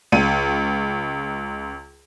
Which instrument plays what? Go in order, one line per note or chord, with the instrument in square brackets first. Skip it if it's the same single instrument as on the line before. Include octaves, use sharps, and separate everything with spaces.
[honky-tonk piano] C#2 D#7